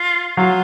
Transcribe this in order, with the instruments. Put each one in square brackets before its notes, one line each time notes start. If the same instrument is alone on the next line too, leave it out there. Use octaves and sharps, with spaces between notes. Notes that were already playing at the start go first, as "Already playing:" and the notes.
Already playing: [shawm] F4
[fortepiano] F#3 [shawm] F4